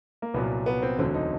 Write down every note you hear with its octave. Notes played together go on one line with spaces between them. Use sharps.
A#3
C2 A#2 F#3 B3
B3
C4
E1 D2 D3 F#3 C4
D#4